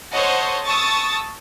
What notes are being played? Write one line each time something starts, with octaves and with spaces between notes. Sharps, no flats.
A4 C5 C#5 D#5 F#5
A5 C#6 D#6 E6 A6